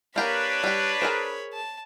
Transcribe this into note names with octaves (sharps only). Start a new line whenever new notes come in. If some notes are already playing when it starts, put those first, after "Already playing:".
A#3 D4 G4 A#4 B4 C#5 B5
G3 G4
G#4 A#4 C5
A5